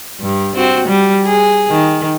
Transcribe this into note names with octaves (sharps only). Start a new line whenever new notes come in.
G2
C4 F#4
G3
G#4
D#3